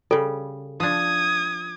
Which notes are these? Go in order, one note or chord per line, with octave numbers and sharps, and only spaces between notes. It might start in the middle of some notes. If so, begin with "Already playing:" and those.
C#3 G3 A4
F3 D4 D#6 G#6